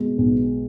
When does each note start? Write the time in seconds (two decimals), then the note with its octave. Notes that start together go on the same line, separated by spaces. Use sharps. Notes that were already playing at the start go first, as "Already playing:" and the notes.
Already playing: B2 G#3
0.18 B1